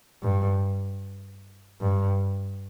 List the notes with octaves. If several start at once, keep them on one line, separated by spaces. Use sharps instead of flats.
G2
G2